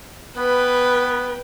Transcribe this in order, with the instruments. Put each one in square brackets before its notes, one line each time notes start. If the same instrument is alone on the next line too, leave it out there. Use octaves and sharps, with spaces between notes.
[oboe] B3 [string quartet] B4 G5